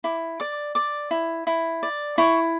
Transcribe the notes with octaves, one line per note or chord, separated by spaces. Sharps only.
E4 D6
D5 D6
D5 D6
E4
E4
D5
E4 C#6